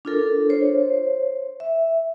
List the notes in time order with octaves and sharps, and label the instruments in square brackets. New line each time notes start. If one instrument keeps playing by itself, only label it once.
[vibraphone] D4 F4 A4 A#4
C5 C#5
E5